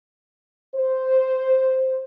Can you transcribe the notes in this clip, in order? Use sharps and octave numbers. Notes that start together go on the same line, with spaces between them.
C5